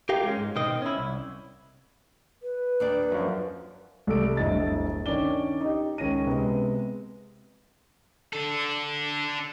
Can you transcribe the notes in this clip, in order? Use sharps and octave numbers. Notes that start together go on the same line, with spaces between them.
G4 A#4 F5 G5
G#3 C#4
G#2
B2 D#3 C4 D#5
C#4 E4
C2
B4
D#2 D4 D5
F#2 F3
C2 A4 D7
D1 G1 D2 E4 D#5 A6
D#3 C#4 D4 D5 G7
D#4 G4
C#2 D#3 C#4 A#6 D#7
C3 G#3 B3 C4
D4 A4